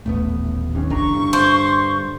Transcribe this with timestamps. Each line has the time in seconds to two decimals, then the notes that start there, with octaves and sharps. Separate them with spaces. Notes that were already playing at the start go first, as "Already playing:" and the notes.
0.06 D#1 A1 A3 B3
0.75 D#2 C#4
0.90 F#1 C2 D3 E3 D4 A#5 C#6
1.13 G2
1.33 C5